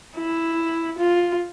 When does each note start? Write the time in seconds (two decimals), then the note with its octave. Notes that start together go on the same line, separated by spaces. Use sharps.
0.16 E4
0.98 F4